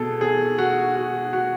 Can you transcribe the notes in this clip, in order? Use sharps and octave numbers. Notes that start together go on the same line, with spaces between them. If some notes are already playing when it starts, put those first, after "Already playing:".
Already playing: B2 G#4 A4
G#4
F#4
F#4
F#4